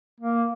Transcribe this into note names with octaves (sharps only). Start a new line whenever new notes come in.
A#3